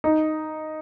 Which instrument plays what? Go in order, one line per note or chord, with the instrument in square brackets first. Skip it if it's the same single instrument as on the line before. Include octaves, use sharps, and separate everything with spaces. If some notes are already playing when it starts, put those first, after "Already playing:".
[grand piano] D#4